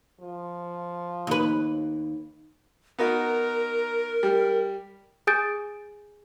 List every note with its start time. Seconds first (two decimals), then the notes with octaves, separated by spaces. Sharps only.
0.21 F3
1.27 D#2 B4
2.99 B3 D#4 F#4 A#4
4.23 G3
5.27 G#4 G#5 D#6 G6 A6 D7